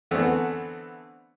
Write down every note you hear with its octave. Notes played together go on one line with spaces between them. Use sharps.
D3 E3 A3 B3 C4